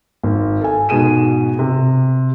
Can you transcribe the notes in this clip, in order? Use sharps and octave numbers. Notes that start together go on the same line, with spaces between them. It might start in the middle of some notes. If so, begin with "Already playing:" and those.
G#1
A4 G#5
G#2 B2 G#4 D#7 E7
C3